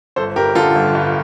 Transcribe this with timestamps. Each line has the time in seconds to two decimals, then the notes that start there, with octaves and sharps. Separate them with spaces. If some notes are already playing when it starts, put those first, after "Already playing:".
0.16 G1 A4 C5
0.36 G2 G4 A#4
0.55 D3 F4 A4
0.75 G1
0.95 G2